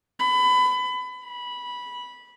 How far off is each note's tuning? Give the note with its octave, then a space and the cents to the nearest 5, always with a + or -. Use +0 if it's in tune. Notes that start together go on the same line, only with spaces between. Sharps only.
B5 +25
B5 -15